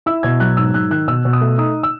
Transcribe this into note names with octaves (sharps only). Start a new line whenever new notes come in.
E4 E6
B2 G#6
F#3 F#6
G#2 E6
G#2 F#6
D#3 F#6
B2 E6
B2
D#6
A3
D#4 D#6
E6